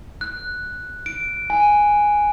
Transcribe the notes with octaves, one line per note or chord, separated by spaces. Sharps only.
F#6
D7
G#5